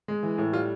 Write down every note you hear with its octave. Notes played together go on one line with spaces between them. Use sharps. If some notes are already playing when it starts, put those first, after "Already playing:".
G#3
E3
A2
G3 F4